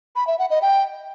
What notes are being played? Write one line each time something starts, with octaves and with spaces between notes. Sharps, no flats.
B5
E5
F#5
D#5
G5